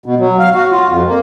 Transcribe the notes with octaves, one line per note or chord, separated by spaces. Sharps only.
B2
F#3
F5
F#4
F4
F2
A#3